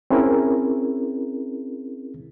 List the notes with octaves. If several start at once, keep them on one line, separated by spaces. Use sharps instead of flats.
C4 C#4 E4 G#4 A#4